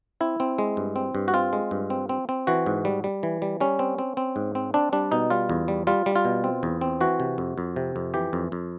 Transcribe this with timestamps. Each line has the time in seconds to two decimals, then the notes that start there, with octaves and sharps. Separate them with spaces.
0.21 C4 E4
0.40 C4
0.58 G#3
0.77 G2
0.96 C4
1.15 G2
1.28 F#4
1.34 C4 F4
1.53 G#3
1.71 G2
1.90 C4
2.09 C4
2.29 C4
2.47 E3 F#4
2.66 G#2
2.85 G3
3.04 G3
3.23 E3
3.42 G3
3.60 G3 C#4
3.79 C4
3.99 C4
4.17 C4
4.36 G#2
4.55 C4
4.74 C4 D4
4.92 G3 D4
5.12 B2 D#4
5.30 G3 F4
5.49 E2
5.68 G3
5.87 G3 F4
6.06 G3
6.16 F4
6.25 B2
6.44 C4
6.63 E2
6.81 C4
7.01 E3 F#4
7.20 C3
7.38 F2
7.58 F2
7.76 C3
7.96 F2
8.14 E3 G4
8.33 F2
8.52 F2